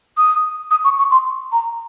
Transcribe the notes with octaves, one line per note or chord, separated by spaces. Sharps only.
D#6
D#6
C#6
C#6
C6
A#5